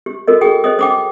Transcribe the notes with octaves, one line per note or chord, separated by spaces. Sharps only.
G4
F#4 A4 A#4 D#5
G#4 G5 D#6
C5 D#5 D#6
G5 D6 D#6